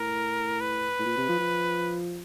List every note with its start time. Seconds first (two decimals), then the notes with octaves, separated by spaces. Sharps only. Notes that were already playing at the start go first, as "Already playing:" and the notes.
Already playing: A2 A#4
0.61 B4
0.99 A2
1.06 A#2
1.17 C3
1.28 F3
1.39 F3